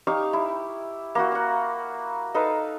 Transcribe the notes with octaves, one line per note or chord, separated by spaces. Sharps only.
D#4 G4 F5 C#6
E4
A#3 E4 F#4
F#5 A#5
D#4 A4 B4 F5